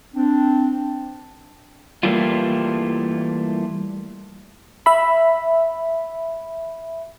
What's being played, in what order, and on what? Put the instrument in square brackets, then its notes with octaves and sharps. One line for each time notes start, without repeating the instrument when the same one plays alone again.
[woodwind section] C4 D4
[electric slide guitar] E3 G3 A3 A#3 E4 F4
[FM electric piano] E5 B5